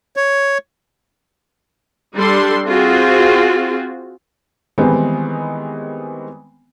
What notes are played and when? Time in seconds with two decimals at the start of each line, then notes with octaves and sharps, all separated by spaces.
0.16 C#5
2.15 G3 D4 A4 C6
2.66 C4 F4 F#4 G#4
4.78 D#3 E3 G3 G#3 B3 C4